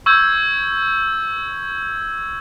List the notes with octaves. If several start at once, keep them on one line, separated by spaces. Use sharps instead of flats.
C#6 E6 G6 G#6